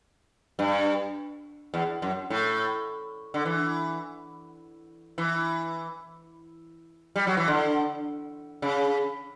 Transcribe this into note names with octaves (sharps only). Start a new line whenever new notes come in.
G2
E2
F#2
A2
D3
E3
E3
G3
F#3
E3
D3
C#3